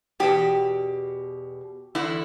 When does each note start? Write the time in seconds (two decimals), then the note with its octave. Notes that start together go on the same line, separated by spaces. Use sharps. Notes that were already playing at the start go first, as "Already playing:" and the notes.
0.20 E2 B2 G4
1.95 E2 D3 E4